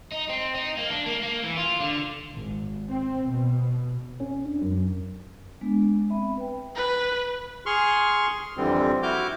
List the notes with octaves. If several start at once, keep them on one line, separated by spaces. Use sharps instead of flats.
D#4
C4
D#4
A#3
D4
A#3
A#3
E3
F4
D3
G#1
C4
B2
C#4
D4
F#2
G#3 B3 D4
C4 E5 B5
B4 G5
B4
G#4 C6 C#6 F6
F2 D3 E3 G3 C4
E4 F#4 D6 F6 G6